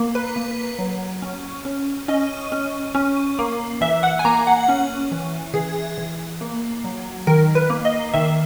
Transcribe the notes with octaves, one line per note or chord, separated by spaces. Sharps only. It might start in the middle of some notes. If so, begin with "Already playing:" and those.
Already playing: A#3
B4
A#3
F#3
C#4
C#4
C#4 D#5
C#4
C#4
A#3
E3 E5
F#5
G#5
A#3 A#5
F#5
C#4
E3
E3 G#4
E3
A#3
F#3
D#3 A#4
B4
A#3
D#5
D#3 E5